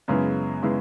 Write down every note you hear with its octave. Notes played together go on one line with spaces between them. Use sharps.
F#2 C#3 G#3 B3 E4
C#3 G#3 B3 E4